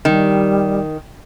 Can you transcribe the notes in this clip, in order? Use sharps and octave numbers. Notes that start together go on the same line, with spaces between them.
D#3 G3